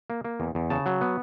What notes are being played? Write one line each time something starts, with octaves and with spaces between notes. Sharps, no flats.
A#3
A#3
E2
E2
C#3 A5
F#3
B3